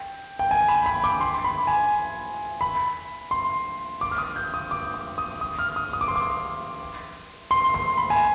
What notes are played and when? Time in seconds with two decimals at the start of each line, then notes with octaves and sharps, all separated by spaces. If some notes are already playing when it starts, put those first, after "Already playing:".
Already playing: G5
0.39 G5
0.51 G#5
0.68 B5
0.86 B5
1.04 D6
1.21 C6
1.44 B5
1.67 G#5
2.61 B5
3.31 C6
4.01 D6
4.11 F6
4.18 D#6
4.36 G6
4.54 D#6
4.71 D6
4.94 D6
5.18 D#6
5.41 D#6
5.59 F6
5.76 D#6
5.93 D#6
6.01 D6
6.08 C6
6.16 D6
7.51 C6
7.74 C6
7.97 B5
8.10 G#5